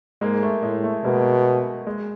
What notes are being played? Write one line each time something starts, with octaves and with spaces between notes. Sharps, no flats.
G#2 G#3 A#3
A3
A2 G#3
A3
B2 G#3 A#3
G#3